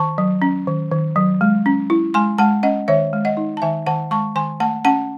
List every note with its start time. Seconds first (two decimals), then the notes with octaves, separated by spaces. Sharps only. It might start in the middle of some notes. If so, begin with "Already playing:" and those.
Already playing: D#3 A5 C#6
0.18 F#3
0.42 C#4
0.67 D#3
0.91 D#3
1.16 F#3
1.41 G#3
1.66 C#4
1.90 E4
2.14 G#3 G#5 C6
2.38 G#3 F#5 A5
2.63 C#4 D#5 F#5
2.88 D#3 C#5 E5
3.13 G#3
3.25 D#5 F#5
3.37 D#4
3.57 A5
3.62 D#3 E5 G#5
3.87 D#3 F#5 A5
4.11 G#3 A5 C#6
4.36 D#3 G#5 C6
4.60 A3 F#5 A5
4.85 C#4 F#5 A5